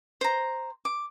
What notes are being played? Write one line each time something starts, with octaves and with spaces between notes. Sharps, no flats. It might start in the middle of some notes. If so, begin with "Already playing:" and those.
C5 A#5
D6